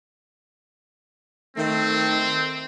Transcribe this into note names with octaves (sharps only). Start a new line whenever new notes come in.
D#3 A3 C4